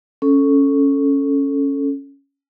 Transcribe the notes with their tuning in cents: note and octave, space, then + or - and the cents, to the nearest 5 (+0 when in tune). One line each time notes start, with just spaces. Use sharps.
C#4 +0 A4 +0